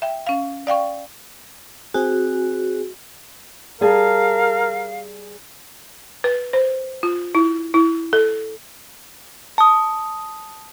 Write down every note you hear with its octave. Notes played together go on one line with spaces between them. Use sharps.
E5 G5
C#4 F5
D5 F5 G5 C#6
C4 F#4 G#4
G3 G#4 A#4 F5 A5
B4
C5
F4
E4
E4
A4
A5 D#6